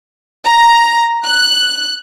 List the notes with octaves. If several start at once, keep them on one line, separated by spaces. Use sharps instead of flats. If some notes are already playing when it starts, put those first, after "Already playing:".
A#5
F#6